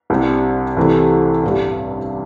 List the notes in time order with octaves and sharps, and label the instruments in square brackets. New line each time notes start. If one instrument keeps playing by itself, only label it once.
[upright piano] C2 C3 G3 D4 G4
C2 C3 E3 A3
A1 G2 G3